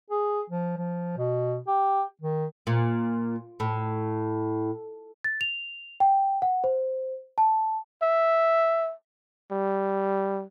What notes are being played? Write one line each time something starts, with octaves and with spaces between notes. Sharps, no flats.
G#4
F3
F3
B2
G4
D#3
A#2
A2
A6
F7
G5
F#5
C5
A5
E5
G3